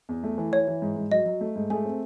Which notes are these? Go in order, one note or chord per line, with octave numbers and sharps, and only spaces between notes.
E2
A3
E3
E3 C#5
E3
G#2
G#2
F#3 D#5
F#3
A3
G#2
A3 G#4 G#5
C4